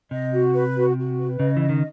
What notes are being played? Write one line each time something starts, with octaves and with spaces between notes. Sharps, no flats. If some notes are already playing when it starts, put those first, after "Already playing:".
C3 D#5
F#4
B4
F#4
F#4
B4
C#3 D#5
E3 D#5
D#3